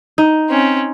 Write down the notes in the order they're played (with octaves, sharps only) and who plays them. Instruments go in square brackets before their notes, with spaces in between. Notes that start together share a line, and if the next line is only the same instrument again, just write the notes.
[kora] D#4
[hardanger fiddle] C4 C#4